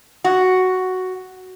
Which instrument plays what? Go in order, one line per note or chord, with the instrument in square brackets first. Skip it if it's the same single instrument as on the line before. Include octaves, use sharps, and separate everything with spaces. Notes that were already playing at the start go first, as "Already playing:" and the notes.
[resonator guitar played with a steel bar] F#4